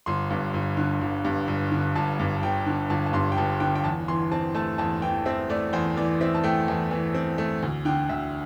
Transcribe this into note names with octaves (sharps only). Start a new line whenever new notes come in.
G1 C6
G2
G1
D3
G1
G2
G1
D3
G1 A5
G2
G1 G5
D3
G1 A5
A5
G2 C6
G5
G1 A5
D3 G5
G5
E2 A5
E3 C6
C4 A5
A3 A5
E2 A5
E3 G5
C4 E5
A3 D5
E2 C5
E3 D5
C4 E5
A5
A3 G5
E2
E3
C4
A3
D2
D3 G5
D2 E5